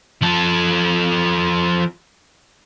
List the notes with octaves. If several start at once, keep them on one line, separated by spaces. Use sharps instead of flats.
F3 A4